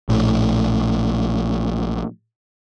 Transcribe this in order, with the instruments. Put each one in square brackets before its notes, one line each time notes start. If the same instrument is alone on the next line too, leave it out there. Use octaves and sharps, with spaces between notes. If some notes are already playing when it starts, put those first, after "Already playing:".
[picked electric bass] A#1 A2